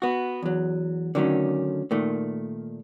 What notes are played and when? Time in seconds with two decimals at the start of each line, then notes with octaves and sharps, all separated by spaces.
0.02 B3 F#4
0.43 E2 F#3
1.15 D3 D#3 F#3 A3 C#4
1.91 A#2 D#3 A3